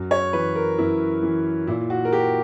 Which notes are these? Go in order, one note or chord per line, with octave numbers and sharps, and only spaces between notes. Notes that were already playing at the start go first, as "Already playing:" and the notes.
Already playing: F#2
C#5
E3 B4
A#4
F#2 E4
E3
A#2 E4
F#4
A#4
G4